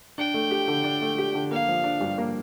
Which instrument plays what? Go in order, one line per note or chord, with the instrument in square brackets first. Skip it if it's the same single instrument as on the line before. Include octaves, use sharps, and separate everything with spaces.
[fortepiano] D4 [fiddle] G5
[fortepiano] A3
G4
D3
D4
A3
G4
D3
[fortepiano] A#3 [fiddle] F5
[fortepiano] F3
D4
G2
A#3